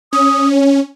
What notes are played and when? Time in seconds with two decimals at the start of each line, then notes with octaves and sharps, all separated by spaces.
0.13 C#4 D#6
0.52 C#5